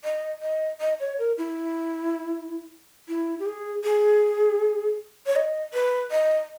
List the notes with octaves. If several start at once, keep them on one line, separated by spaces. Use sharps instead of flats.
D#5
D#5
D#5
C#5
A#4
E4
E4
G4
G#4
G#4
C#5
D#5
B4
D#5